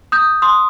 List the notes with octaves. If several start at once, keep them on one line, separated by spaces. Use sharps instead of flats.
D#6 G6
C6 D#6